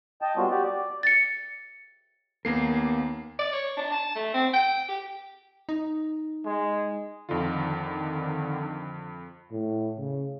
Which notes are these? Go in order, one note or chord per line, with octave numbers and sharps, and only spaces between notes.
D#5 G5 A5
G3 A#3 B3 C#4 F4 F#4
F#4 G4 D5
D5
A6 C#7
D#2 A#3 B3 A#4 C7
D5
C#5
D4
A5
A3
C4
G5
G4
D#4
G#3
F2 D3 D#3 F4
A2
C#3